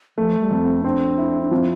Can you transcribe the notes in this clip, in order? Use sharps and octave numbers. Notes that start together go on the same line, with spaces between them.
F3 A3
G3
F2
C4
C4 D4
E4
D4
F3 C4